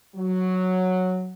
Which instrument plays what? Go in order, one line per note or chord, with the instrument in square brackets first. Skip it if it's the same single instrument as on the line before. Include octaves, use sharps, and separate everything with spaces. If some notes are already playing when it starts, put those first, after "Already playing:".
[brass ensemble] F#3